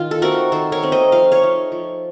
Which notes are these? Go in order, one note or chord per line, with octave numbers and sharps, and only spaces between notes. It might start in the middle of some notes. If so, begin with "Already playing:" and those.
Already playing: D#3 F4
A4
A3 C4 D#4 F#4 A#4
D#3 A4 C5
A#4 C#5
A3 C4 D#4
C5 D#5
F3 F5
C#5 F5
A3 D#4
F3